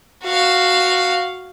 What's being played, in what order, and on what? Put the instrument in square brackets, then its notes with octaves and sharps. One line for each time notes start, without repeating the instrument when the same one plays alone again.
[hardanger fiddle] F#4 F5